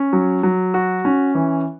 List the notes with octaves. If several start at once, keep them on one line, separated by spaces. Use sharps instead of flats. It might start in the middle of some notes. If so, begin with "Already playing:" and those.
Already playing: C#4
F#3
F#3
F#4
C#4
E3